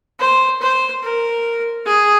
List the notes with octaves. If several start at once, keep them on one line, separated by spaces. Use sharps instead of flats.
C5
C5
A#4
G#4